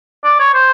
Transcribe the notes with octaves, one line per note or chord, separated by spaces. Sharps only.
D5
C#5
C5